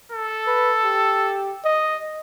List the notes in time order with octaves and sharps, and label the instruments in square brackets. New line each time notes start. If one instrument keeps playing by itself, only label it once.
[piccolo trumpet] A4
[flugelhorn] B4
G4
D#5